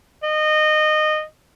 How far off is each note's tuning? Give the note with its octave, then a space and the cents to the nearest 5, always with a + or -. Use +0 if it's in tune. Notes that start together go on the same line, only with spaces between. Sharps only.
D#5 -20